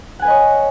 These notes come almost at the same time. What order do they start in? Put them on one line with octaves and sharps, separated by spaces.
F#5 G#5 B4 D#5 C#5